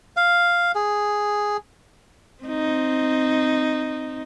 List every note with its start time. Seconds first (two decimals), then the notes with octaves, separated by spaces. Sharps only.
0.17 F5
0.75 G#4
2.44 C4 D#4